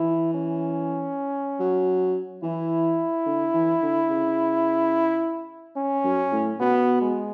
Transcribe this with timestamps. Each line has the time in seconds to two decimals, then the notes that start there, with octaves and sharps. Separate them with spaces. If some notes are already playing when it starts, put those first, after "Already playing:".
Already playing: E3 E4
0.34 C#4
1.59 F#3
2.43 E3 E4
3.26 D3
3.54 E3
3.82 D3
4.09 C#3
5.77 C#4
6.04 F#2
6.32 A2
6.60 B2 B3
7.02 G#3